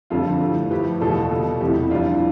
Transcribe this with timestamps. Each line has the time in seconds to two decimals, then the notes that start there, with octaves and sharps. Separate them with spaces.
0.10 F2 D3 G3 F4 A4
0.41 A2 G3
0.71 A2 F3 A3 G4 B4
1.01 E2 B2 G3 F4 A4
1.31 B2 G3
1.61 E2 C3 G3 E4 G4
1.90 F2 E3 G3 D4 F4